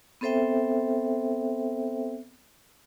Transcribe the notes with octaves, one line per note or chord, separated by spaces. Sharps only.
B3 C4 A4 C5 E5 G5